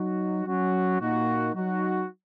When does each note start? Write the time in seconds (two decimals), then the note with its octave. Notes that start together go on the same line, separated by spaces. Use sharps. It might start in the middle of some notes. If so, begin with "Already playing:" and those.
Already playing: F#3 D#4 F#4
0.46 F#3 C#4 F#4
1.00 A#2 A#3 D#4 F#4
1.54 F#3 D#4 F#4